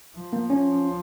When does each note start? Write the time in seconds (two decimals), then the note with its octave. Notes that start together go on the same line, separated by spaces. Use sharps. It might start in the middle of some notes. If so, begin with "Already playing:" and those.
0.15 F3
0.33 A#3
0.50 C#4